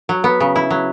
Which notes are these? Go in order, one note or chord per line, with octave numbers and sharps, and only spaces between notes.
F#3
B3
C#3
E4
F#3